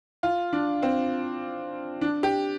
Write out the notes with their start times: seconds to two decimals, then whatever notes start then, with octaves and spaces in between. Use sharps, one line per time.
0.23 F4
0.53 D4
0.83 C4
2.01 D4
2.23 G4